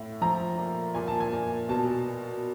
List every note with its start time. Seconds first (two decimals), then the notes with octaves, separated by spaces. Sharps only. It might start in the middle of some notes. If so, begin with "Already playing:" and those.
Already playing: A2
0.21 F3 A#5
0.58 A#2
0.95 A#2 G#5
1.08 A5
1.20 G#5
1.32 A#2
1.69 B2 A5